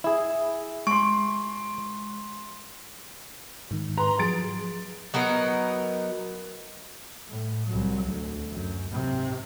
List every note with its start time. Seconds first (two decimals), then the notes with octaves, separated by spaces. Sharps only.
0.04 E4 G#4 E5
0.87 G#3 C6 C#6 D7
3.71 G#2 D#3
3.97 B4 A#5 C6
4.19 F3 F#3 G#4 A6 D7
5.14 F#3 B3 D#4 A#4
7.30 A2
7.67 C2 F#3
8.08 D2
8.51 F#2
8.89 G#2 C3